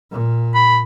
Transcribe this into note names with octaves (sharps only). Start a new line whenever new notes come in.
A#2
B5